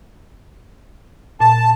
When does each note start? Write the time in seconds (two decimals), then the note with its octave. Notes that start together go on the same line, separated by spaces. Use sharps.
1.41 A#2 A5